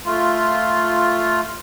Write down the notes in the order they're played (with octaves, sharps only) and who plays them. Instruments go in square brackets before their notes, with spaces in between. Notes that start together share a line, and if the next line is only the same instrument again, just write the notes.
[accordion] A3 F4